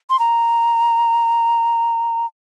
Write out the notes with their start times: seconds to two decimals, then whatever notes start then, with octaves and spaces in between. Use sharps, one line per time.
0.10 C6
0.19 A#5